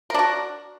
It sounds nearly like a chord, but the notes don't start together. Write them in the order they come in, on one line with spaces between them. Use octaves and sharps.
A#4 D4 F#4